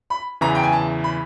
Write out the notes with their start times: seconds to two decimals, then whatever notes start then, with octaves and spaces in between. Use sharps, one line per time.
0.10 B5
0.41 E2 C#3 E3 A#5
0.55 G5
0.63 G#5
0.72 A5
1.04 B5